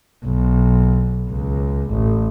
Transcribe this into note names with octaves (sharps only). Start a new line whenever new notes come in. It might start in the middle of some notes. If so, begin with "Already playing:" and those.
B1
C#2
A1